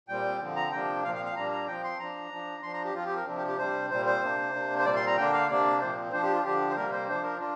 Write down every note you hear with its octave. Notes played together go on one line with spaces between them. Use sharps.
A#2 G3 C4 G5
D3 F3 C4
A#5
C3 F3 A#3 D4 G5
A#2 F3 C4 F5
F5
F5
A#2 G3 A#3 D4 A#5
A#5
F3 C4 G5
C6
F3 D4 A#5
F3 D4
F3 D4 C6
A#5
G4
F3 C4 F4
G4
A#4
C3 F3 D4
G4
G4
C3 G3 D4 C5
A#2 G3 C4 C5
C5
C3 A#3 D4
C3 A#3 D4
C5
A#2 G3 C4 D5
C6
A#5
D3 A#3 D4 G5
F5
C3 A#3 D4 D5
A#2 F3 C4 C5
F3 D4 C5
G4
F4
D3 F3 D4 G4
C5
C3 G3 A#3 A#4
C5
F3 D4 C5
A#4
D4 F4